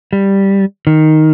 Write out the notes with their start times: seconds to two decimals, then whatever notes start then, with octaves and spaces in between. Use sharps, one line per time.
0.13 G3
0.87 D#3